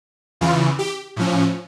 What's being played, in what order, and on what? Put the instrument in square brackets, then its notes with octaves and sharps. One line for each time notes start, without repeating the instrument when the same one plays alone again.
[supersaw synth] E2 C#3 E3 F4
G4
A2 F3 C#4